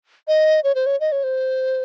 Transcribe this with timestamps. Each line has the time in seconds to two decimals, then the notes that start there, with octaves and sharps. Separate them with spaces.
0.28 D#5
0.64 C#5
0.75 C5
0.86 C#5
1.00 D#5
1.12 C#5
1.24 C5